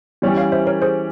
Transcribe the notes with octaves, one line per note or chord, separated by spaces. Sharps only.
E3 G3 C#4 G4
C#5 F5
C5 E5
A#4 C#5
G#4 C5